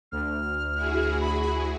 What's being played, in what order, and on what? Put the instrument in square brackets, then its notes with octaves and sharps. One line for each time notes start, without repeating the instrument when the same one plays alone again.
[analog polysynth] D2 [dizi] F6
[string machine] E4 F#4 G#4
[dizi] B5